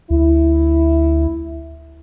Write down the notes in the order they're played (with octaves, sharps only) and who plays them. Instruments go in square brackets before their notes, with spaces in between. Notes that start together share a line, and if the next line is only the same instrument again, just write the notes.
[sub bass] D2 [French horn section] E4